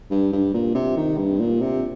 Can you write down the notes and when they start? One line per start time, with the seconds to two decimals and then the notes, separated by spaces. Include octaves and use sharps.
0.11 G2
0.32 G2
0.54 A#2
0.75 C3
0.97 D#3
1.17 G2
1.40 A#2
1.61 C3